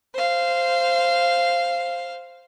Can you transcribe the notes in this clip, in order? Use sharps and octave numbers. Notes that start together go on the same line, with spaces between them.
C5 F5